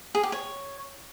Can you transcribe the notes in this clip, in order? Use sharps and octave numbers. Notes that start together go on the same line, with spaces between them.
G#4
G4
C#5